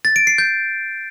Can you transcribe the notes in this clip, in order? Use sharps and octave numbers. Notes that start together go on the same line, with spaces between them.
A6
D7
C7
G6